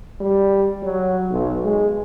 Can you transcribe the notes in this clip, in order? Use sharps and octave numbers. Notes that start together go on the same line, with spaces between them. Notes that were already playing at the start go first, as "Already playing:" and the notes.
G3
F#3
B1
G#3